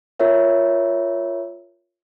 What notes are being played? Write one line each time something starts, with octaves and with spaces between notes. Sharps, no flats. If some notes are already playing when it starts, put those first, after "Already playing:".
F4 A#4 C#5 E5